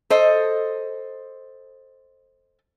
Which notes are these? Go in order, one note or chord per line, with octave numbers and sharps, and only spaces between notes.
A4 C5 D#5